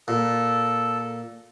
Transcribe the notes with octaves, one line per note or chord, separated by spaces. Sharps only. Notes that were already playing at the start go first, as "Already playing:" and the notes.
A#2 A4